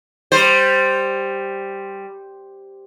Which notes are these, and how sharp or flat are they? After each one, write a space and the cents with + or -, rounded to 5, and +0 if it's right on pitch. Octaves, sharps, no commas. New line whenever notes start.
G3 +0 C5 +0